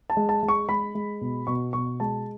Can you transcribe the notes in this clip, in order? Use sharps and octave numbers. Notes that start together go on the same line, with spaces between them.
A5
G#3
A5
G#3
C#6
G#3 B5
G#3
B2
B2 C#6
B2 C#6
G#3 A5